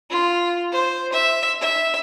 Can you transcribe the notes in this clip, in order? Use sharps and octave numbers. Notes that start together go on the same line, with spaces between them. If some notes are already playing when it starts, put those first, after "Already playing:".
F4
C5
E5
E5